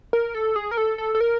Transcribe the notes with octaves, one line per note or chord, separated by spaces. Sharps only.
A#4
A4
G#4
A#4
A4
A4
A4
A#4